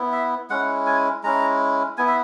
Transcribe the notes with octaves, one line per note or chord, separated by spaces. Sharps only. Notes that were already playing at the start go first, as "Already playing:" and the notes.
Already playing: B3 E4
E5
G#3 C#4 E4 F#5
G#5
G#3 C#4 E4 A#5
B3 E4 G#5
E5